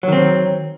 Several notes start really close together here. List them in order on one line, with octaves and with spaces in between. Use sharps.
F#3 D#3 C4